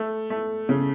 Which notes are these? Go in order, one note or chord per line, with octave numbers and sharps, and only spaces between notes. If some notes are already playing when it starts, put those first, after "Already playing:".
Already playing: A3
A3
C#3